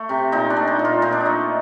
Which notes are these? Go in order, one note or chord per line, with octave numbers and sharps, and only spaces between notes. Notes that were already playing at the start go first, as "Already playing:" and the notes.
Already playing: A3
C3
A#2 D#4
D4
A3
D#4
A#2
F4
A#2 D#4
D4
D#4
A3